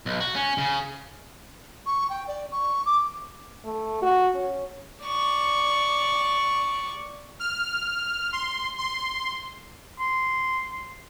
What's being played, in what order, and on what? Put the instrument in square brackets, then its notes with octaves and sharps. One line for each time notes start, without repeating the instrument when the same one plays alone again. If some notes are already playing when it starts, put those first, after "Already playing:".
[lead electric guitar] B1
F#4
C#4
C#3
[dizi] C#6
G5
D5
C#6
D6
[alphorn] A3
F#4
C#4
[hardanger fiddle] D5 C#6
[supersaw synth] F6
C6
C6
[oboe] C6